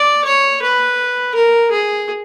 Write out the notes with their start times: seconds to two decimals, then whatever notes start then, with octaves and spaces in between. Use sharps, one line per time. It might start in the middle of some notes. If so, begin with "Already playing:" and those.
Already playing: D5
0.25 C#5
0.62 B4
1.35 A#4
1.71 G#4